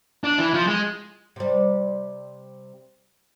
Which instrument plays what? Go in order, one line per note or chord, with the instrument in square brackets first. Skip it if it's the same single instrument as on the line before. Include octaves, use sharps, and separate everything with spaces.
[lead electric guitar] D4
E3
F3
G#3
[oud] C3 G3